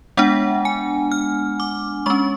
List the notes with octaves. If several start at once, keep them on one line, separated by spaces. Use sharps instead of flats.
G#3 B3 D4 F#5
G#5
F6
D6
G#3 C#4 C#6